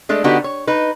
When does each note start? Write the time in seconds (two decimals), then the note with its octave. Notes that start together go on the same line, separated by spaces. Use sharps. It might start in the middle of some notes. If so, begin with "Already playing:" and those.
0.09 G#3 A3 D4
0.24 D3 B3 D4 D#4 F#4 G4
0.44 C#5
0.67 D#4 B4